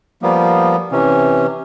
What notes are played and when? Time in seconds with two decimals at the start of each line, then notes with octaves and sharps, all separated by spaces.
0.23 F3 G3 A#3 B3
0.92 C3 E3 C#4